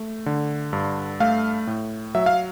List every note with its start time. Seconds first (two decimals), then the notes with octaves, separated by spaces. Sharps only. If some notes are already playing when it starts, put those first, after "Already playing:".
Already playing: A3
0.26 D3
0.73 G2
1.20 A3 F5
1.67 A2
2.15 F#3 E5
2.26 F5